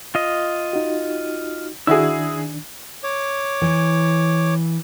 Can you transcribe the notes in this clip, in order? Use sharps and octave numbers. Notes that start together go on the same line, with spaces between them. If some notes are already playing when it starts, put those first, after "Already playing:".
F4 D#5
D#4 F#4
D#3 D4 E4 F#4 G#4 E6
C#5 D6
E3